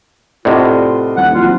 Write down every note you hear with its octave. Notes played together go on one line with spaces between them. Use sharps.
A2 C3 F4 D5 D#5 F#5
D#1 F#5 F#6
E3 F#3 C4 F4